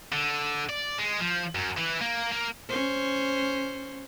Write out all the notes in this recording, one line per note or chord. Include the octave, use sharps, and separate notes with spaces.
D3
D5
G#3
F3
F#2
E3
A#3
A#3
C#4 C5